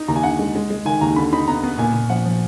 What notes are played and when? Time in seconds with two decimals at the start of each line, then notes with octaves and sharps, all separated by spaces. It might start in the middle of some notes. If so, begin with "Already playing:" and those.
Already playing: D#4
0.08 D#2 A#5
0.16 G#5
0.23 D3 F#5
0.39 G#3
0.55 G#3
0.71 G#3
0.85 D#3 G#5
1.01 D#2 A#5
1.16 D3 B5
1.33 D#4 B5
1.48 B3 A#5
1.63 B3
1.78 A#2 G#5
1.94 A#2
2.09 F3 F#5
2.25 F3